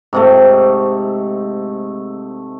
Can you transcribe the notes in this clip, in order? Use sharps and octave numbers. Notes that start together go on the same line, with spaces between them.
G#2 C3 A3